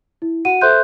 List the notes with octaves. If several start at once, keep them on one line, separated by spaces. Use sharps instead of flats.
E4
F#4 F#5 D#7
A4 C5 E5 C6 F#6 G6